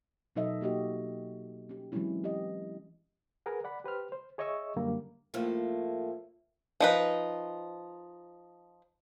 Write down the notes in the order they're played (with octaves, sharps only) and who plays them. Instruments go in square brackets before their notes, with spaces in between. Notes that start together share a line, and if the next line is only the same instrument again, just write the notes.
[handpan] B2 F#3 D#4 A4 D#5 E5
A#3 F#4 G4 D#5
C#4 G4
E3 F#3 G#3 C4 C#4 E4
G4 D#5
[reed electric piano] G#4 A#4 B4 F#5
D5 F#5 B5
G4 B4 C5 F6
C5
G#4 C#5 D#5 E5 C#6 E6
F#2 D3 G3 A#3
[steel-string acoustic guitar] A2 F3 A3 A#3
[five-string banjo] F3 D#4 B4